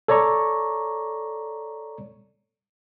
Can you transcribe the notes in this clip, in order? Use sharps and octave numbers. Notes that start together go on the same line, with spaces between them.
A4 C#5 D5 A#5 C#6